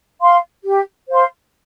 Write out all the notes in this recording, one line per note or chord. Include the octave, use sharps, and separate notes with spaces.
F5 C6
G4
C5 F5 C6